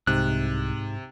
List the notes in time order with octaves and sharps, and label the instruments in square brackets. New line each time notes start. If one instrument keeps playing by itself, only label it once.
[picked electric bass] C2 [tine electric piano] G#2 [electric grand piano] C3 [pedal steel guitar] F#6